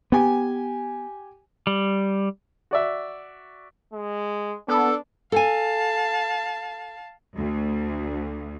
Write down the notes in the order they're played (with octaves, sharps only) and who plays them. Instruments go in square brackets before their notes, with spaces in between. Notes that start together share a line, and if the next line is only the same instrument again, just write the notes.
[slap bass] B3 [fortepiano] G4 G#5
[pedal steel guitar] G3
[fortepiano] F#4 D5 E5
[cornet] G#3
[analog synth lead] B3 [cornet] D4 [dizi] A4
[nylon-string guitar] A4 G#5 [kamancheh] F5 A5
[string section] D2